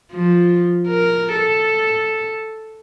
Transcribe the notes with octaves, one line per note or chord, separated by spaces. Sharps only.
F3
A#4
A4